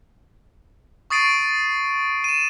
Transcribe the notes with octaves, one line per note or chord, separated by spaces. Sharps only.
C#6 D#6 A6 C7 D7 D#7
D#7 E7